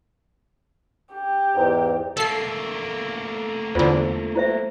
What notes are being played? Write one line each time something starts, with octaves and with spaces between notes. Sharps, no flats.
G4
E2 G#2
A3 A#3 A4 C7
E2 D3 F4 C5
E4 C5 E5